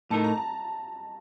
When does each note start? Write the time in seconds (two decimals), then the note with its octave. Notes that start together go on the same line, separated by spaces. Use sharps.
0.10 A2 A3 D#4 A#4 A5
0.24 A#5
0.38 A5